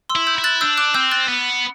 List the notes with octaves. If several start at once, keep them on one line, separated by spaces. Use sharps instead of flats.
C6 E6
E4
E6 G6
E4
F#6 A6
D4 E6 G6
D6 F#6
C4 E6 G6
F#6 A6
B3